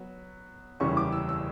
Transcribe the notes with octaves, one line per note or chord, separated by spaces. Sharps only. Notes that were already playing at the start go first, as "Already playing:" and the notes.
Already playing: F#3 B3
F#1 E2 C#3 G3 C#4 C#6
D6
E6
E6